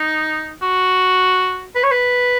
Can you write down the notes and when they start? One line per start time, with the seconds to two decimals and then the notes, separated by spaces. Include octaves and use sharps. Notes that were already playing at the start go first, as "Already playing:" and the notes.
Already playing: D#4
0.62 F#4
1.75 B4
1.83 C#5
1.91 B4